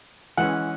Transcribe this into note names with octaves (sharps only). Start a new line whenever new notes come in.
E3 G#3 C#4 F#5